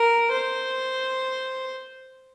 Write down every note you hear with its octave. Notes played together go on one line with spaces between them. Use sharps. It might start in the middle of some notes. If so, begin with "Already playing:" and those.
Already playing: A#4
C5